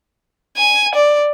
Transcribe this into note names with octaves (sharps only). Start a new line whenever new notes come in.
G#5
D5